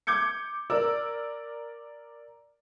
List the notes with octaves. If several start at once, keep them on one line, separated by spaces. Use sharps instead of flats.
D6 G6 G#6 C#7
A#4 D5 E6